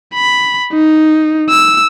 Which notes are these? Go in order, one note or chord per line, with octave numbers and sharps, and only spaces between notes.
B5
D#4
E6